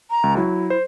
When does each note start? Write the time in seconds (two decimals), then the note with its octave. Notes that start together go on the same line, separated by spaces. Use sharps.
0.10 A#5
0.23 C#2
0.37 F#3 E4
0.70 C5